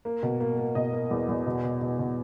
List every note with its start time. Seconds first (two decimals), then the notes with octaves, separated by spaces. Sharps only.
0.05 A#3
0.23 B2
0.40 A#3
0.58 A#3
0.75 B2 D#5
0.93 A#3
1.11 E2
1.28 E2
1.46 B2
1.63 B2
1.81 B2
1.99 B2